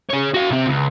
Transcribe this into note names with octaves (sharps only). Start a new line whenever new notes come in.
G#4 C#5
F#4 F5
C3 C4
C#2